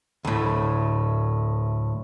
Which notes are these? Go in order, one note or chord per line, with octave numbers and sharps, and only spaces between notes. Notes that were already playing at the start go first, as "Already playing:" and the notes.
D2 A2